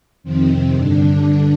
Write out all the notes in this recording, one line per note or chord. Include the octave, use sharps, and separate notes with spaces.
F2 C3 D#3 C4
G2 D3 D4